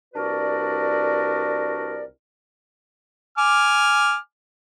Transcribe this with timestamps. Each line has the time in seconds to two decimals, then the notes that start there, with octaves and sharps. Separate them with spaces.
0.14 C2 D4 F#4 A#4 B4 D5
3.38 G#5 D6 F6